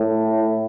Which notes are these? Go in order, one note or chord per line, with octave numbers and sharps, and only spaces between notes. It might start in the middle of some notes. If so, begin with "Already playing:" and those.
Already playing: A2